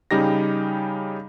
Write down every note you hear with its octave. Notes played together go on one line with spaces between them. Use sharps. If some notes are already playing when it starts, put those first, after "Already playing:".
C#3 G3 D#4 G4 A#6